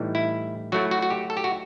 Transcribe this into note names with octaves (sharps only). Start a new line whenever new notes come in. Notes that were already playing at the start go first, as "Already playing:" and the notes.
Already playing: A2 E3 G3 D#4
E4
F#3 A3 E4 F#4
F#4
F#4
G4
A4
G4
F#4